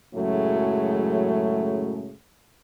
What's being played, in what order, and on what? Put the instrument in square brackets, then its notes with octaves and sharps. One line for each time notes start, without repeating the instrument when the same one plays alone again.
[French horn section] F#2 A2 C#3 F#3 G#3 A3